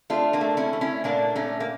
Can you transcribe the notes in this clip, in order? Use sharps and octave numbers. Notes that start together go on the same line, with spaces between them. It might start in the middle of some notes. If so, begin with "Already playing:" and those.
A3 D4 F4
A#3 D4
A3
C#4 E4
A3
C#4 E4
A#2 A#3 D4
A#2 A3 C#4
A#3